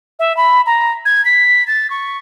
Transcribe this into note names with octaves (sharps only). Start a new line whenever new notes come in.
E5
B5
A#5
G#6
B6
A6
C#6